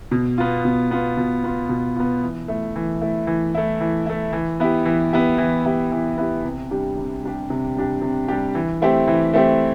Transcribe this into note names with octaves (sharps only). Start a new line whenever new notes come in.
B2
B3 F4
B2
B3 F4
B2
B3 F4
B2
B3 F4
E3
A3 E4
E3
A3 E4
E3
A3 E4
E3
A3 E4
E3
B3 E4 G4
E3
B3 E4 G4
E3
B3 E4 G4
E3
B3 E4 G4
C3
G3 D4 G4
C3
G3 D4 G4
C3
G3 D4 G4
C3
G3 D4 G4
E3
A3 C4 E4 G4
E3
A3 C4 E4 G4